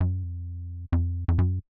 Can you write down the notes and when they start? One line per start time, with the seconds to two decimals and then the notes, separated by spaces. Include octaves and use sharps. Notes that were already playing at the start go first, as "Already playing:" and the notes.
0.01 F#2
0.23 F2
0.92 F2
1.28 F2
1.38 F#2